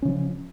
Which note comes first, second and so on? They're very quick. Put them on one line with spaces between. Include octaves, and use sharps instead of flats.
C#4 C#3 F3